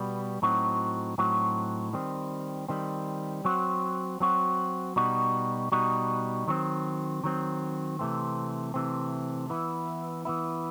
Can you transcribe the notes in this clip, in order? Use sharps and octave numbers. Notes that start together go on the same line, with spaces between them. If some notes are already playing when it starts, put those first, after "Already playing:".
Already playing: B2 G3 B3
A2 F#3 C4 D#4 F#4
A2 F#3 C4 D#4 F#4
D#3 G3 C4
D#3 G3 C4
F#3 C4 F#4
F#3 C4 F#4
B2 G3 D#4 F#4
B2 G3 D#4 F#4
D#3 F#3 C4
D#3 F#3 C4
C3 E3 A3 C4
C3 E3 A3 C4
E3 B3 E4
E3 B3 E4